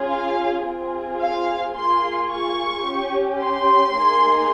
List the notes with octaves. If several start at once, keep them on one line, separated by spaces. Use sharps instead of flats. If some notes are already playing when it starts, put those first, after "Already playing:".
Already playing: C#4 F4 G#4
F5
C4 F4 G#4
F5
A#3 F4 G#4 C6
C#6
C#4 G4
C6
A#3 D#4 G#4